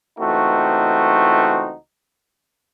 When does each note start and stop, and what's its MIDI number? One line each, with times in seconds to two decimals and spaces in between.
0.19 1.74 37
0.19 1.74 52
0.19 1.74 57
0.19 1.74 60
0.19 1.74 63
0.19 1.74 66